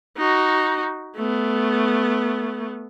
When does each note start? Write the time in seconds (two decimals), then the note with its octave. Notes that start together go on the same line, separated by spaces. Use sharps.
0.17 D#4 F#4
1.16 A3 B3